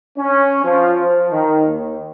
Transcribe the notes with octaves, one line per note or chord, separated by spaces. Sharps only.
C#4
F3
F3
D#3
D#2